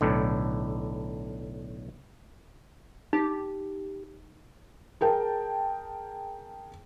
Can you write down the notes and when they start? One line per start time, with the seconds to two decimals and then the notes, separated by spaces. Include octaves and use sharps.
0.01 B1 A2 D3
3.13 D#4 G4
5.01 G#4 A#4 G5 A5